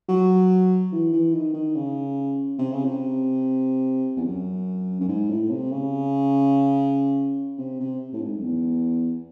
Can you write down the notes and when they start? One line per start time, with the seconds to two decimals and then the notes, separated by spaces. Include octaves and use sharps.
0.09 F#3
0.92 E3
1.13 E3
1.34 D#3
1.54 D#3
1.75 C#3
2.59 C3
2.72 C#3
2.85 C3
4.17 E2
4.25 F#2
5.01 F#2
5.09 G#2
5.29 A2
5.50 C3
5.72 C#3
7.58 C3
7.80 C3
8.13 A2
8.21 G#2
8.37 F#2
8.42 E2